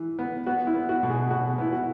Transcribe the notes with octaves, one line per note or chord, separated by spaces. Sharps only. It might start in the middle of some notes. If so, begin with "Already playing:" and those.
Already playing: E3
B3
B3 F#4
E4
B3
F#4
B2
G#4
B2 F#4
B3 E4
F#4